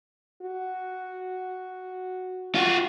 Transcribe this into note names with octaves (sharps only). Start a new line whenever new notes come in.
F#4
F4 F#4